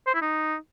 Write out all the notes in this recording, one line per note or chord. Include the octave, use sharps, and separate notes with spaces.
C5
E4
D#4